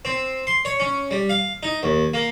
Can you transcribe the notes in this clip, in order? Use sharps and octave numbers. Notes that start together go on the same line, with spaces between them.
C4
C6
C#5
C#4
G3
F5
D#4
D#2
A#3